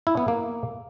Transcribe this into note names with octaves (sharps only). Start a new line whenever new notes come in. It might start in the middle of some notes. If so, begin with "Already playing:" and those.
E4
B3
A#3